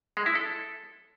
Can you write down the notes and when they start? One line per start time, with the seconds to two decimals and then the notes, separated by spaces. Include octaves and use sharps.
0.17 G#3
0.26 E4
0.35 A4